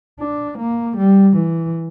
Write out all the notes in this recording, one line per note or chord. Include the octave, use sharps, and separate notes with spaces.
D4
A#3
G3
E3